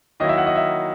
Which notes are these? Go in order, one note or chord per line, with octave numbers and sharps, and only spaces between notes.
D#3 F#3 A#3 E4 D#5
E5
F#5
D#5
E5